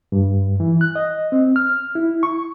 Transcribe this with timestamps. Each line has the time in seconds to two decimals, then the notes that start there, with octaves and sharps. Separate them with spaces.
0.12 G2
0.60 E3
0.81 F#6
0.96 D#5
1.32 C4
1.56 F6
1.95 E4
2.23 C#6